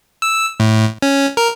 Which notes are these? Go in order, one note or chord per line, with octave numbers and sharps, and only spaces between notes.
E6
A2
C#4
A#4